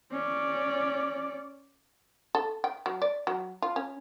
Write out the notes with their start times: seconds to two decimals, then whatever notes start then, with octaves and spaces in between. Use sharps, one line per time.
0.12 C#4 D5
2.35 A4
2.64 G5
2.86 F#3
3.02 D5
3.27 F#3
3.62 F4
3.76 C#4